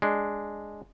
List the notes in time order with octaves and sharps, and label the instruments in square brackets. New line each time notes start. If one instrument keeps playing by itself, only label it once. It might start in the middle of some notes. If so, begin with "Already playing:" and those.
[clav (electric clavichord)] G#3 D4